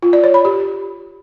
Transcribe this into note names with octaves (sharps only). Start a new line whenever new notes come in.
F4
D5
C#5
B5
G4